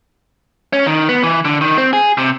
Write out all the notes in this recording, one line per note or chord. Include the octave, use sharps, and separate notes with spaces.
C#4
D#3
B3
E3
D3
D#3
C4
G#4
C3